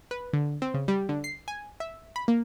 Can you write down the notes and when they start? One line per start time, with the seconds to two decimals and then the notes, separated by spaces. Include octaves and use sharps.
0.11 B4
0.33 D3
0.62 C4
0.74 C#3
0.88 G3
1.09 D3
1.24 C7
1.48 G#5
1.80 E5
2.16 B5
2.28 A#3